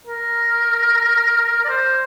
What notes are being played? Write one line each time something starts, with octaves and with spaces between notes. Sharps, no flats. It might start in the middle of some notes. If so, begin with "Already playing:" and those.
A#4
D5
C5